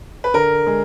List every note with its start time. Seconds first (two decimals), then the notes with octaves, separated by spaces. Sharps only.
0.24 B4
0.34 D3 A#4
0.67 G#3